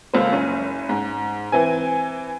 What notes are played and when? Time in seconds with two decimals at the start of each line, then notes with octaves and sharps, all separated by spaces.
0.14 D#1 C#2 A#3 F4 C5
0.33 F#1 C#4
0.89 G#2
1.52 E3 C4 G#5